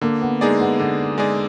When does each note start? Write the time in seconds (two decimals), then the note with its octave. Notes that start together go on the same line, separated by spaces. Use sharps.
0.01 D3 A#3
0.21 B3
0.41 G#3 A#3 D#4 G#4 D5
0.61 B3
0.79 D3 B3
1.18 G#3 D#4 G#4 D5